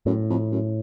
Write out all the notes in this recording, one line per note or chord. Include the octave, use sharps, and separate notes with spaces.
F#2 A2
F2
F#2